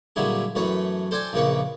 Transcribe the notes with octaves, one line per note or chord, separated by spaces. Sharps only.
A#2 D3 F#3 G3 E4 G#4
F#2 E3 A3 B4 C#5
A4 C5 D5 G5 G#5
A#1 F2 C#3 A#3 B4 C#6